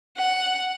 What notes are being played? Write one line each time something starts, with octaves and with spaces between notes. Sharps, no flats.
F#5